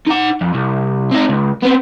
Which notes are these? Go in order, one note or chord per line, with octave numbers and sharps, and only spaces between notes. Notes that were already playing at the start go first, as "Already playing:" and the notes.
D#4 F#5
F2
C2
C4 D#4
C#2
B3 C4